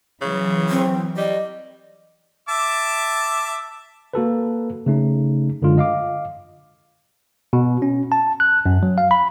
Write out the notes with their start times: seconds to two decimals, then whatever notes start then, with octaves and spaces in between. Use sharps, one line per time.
0.21 C#3 E3 F#3
0.69 C4
1.17 G3 D#5
2.49 E5 A5 D6
4.14 A#3 F#4 A4 B4
4.86 C#3 A3 D#4
5.62 F#2 D3 G#3 F4
5.78 D#5 F5 D6
7.53 B2
7.82 C#4
8.12 A5
8.40 F#6
8.66 F#2
8.83 F#3
8.98 F5
9.11 B5